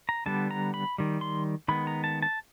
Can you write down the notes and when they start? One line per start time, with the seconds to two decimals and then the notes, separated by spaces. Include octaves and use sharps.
0.09 A#5
0.26 D3 G3 B3 A5
0.51 A#5
0.74 B5
0.98 D#3 G3
1.21 C6
1.68 D#3 G#3 B3 B5
1.87 A#5
2.04 A5
2.22 A5